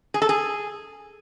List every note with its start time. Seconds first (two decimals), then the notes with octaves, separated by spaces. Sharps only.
0.14 G#4
0.22 A4
0.29 G#4